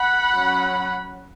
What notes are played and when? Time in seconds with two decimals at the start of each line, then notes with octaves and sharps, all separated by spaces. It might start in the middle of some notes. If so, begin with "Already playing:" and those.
Already playing: F#5 B5
0.32 F#3 C#4